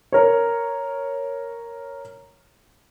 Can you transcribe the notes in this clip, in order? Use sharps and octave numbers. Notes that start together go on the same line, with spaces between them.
A#4 C#5